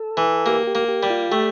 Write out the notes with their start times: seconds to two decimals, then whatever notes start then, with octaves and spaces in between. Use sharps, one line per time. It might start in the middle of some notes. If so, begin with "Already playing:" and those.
Already playing: A4
0.17 E3
0.46 A#3 G4
0.67 G4
0.75 A#3
0.88 G4
1.03 G3
1.10 F4
1.31 A3 G4